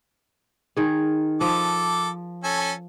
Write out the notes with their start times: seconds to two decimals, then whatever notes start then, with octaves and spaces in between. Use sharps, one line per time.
0.77 D#3 G#4
1.41 F3 A4 D6
2.44 C#4 A4 G#5